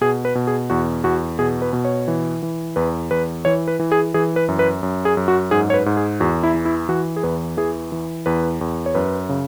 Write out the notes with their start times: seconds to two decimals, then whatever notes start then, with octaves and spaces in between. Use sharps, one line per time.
0.01 B2 G#4
0.25 B4
0.35 B2
0.47 G#4
0.70 E2 F#4
1.04 E2 F#4
1.39 B2 G#4
1.62 B4
1.73 B2
1.85 C#5
2.08 E3
2.43 E3
2.76 E2 B4
3.11 E2 B4
3.45 E3 C#5
3.68 B4
3.80 E3
3.92 G#4
4.14 E3 G#4
4.36 B4
4.48 F#2
4.59 B4
4.83 F#2
5.05 G#4
5.17 F#2
5.28 F#4
5.51 G#2 G#4
5.70 C#5
5.74 B4
5.86 G#2
5.97 G#4
6.20 E2 F#4
6.43 E4
6.54 E3
6.65 E4
6.89 E3 F#4
7.16 G#4
7.23 E2 B4
7.57 E3 G#4
7.92 E3
8.26 E2 B4
8.61 E2
8.86 C#5
8.95 F#2 B4
9.29 C#3